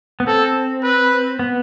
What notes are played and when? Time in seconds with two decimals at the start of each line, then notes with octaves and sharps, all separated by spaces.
0.20 B3
0.27 C4 A4
0.84 B4
1.39 B3